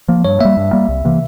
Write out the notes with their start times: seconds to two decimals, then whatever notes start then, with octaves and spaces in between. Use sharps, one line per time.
0.08 F3 A#3
0.25 G2 C#5
0.40 G3 A#3 E5
0.57 G2
0.73 G3 A#3
0.88 C2
1.05 C3 E3 A#3